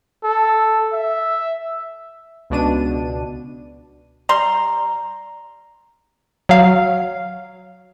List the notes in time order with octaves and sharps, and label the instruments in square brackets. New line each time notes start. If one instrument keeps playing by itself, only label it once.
[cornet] A4
E5
[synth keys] C#2 B2 D4 D#7
[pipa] G3 C6 [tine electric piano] A#5
[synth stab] F#3 F5